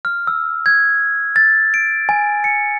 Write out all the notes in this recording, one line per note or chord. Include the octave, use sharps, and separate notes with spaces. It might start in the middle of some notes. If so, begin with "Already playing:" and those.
F6
E6
G#6
A6
D7
G#5
C#7